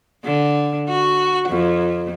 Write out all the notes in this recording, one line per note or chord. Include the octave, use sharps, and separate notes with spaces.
D3
F#4
F2